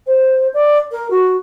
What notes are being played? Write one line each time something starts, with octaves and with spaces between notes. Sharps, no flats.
C5
D5
A#4
F#4